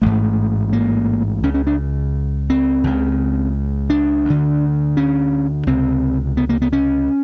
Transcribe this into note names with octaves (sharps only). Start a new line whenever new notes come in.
A1 G#2 A3
A#3
C#2 C#3 C#4
C#4
D4
C4
C#2 C#3
D4
D2 D3
C#4
C#2 C3 C4
B3
A#3
B3
C#4